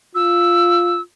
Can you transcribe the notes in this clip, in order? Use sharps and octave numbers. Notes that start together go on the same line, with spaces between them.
F4 E6